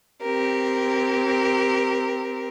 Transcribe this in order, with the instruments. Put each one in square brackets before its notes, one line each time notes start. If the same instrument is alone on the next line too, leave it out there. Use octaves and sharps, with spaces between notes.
[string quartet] C4 G4 A#4